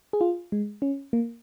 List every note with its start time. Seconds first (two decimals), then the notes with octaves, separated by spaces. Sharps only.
0.13 G#4
0.21 F4
0.52 G#3
0.82 C#4
1.13 A#3